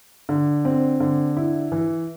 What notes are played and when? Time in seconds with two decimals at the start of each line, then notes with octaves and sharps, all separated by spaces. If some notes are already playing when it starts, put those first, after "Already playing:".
0.29 D3
0.65 C4
1.00 D3
1.37 E4
1.72 E3